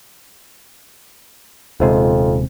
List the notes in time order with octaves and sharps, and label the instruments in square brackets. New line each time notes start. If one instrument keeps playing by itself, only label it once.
[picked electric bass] D#1 C3 G#3 [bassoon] F2